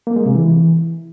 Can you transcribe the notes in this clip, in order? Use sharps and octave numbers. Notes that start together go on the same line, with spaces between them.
A#3
G#3
C3
E3